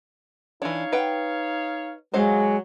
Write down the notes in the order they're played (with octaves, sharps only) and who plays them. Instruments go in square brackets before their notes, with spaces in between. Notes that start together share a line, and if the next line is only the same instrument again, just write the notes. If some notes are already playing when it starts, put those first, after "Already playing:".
[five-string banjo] E3 D4 [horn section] D#4 C#5 F5
[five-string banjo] B4 F#5 G5
[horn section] F#3 [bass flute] G#3 [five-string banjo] C5 D#5 F5